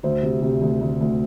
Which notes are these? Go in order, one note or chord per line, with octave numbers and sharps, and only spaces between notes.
D2 C5
C3
C3
D2
D2
D2